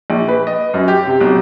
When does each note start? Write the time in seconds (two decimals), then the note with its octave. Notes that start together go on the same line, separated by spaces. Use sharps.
0.10 A#1
0.28 B4
0.47 D#5
0.74 F#2
0.88 G4
1.06 C3
1.21 B1